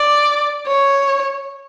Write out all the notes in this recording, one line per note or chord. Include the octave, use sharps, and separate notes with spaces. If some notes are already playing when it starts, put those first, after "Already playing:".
Already playing: D5
C#5